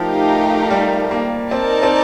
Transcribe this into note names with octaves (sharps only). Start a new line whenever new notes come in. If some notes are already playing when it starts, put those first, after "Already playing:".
Already playing: F3 A3 D#4 G4 A#4 F5
G3
A#3
C4 D#4 A#4 D5 A5
C4